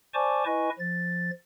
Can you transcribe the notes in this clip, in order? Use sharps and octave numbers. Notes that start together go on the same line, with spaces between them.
C5 D5 G#5 A5 C#6 D6
E4 B4 D#5 G#5 C#6
F3 A6